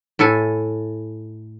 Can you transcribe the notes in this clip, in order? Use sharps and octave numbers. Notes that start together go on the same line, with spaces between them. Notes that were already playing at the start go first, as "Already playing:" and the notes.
A2 E4 A4 G#5